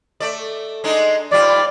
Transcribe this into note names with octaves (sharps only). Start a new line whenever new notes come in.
A3 D5
G#3 D4 D#4
G#2 G3 F4 D5